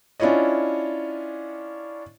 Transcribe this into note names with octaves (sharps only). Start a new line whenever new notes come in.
C#4 D4 E4 F4 C#5 D#5